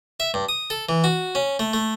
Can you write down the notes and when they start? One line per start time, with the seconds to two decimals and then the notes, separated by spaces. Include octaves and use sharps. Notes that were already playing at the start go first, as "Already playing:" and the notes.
0.20 E5
0.34 G2
0.49 D#6
0.70 A4
0.89 E3
1.04 F#4
1.35 C#4
1.59 A3
1.73 A3